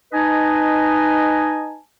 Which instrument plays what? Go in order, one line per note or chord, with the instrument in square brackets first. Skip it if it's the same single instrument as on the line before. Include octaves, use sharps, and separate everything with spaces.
[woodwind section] D#4 B4 D#5 G#5 A5